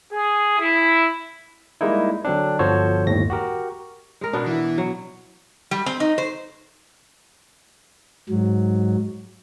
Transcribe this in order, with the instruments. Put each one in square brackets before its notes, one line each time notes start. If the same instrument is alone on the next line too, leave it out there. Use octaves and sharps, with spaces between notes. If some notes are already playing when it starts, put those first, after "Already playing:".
[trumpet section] G#4
E4
[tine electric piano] G3 G#3 A#3 D#4 E4
D3 F#3 C4 D4
G1 F3 F#4 A4 C5 C#5
G1 D#2 A2 A#6
F#4 G4 A#4
[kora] G#3 A#4
B2 B3 D4
[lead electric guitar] E3 E4
[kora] F#3
[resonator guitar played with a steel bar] G3
C4
D#4
C5
[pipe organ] G#2 F#3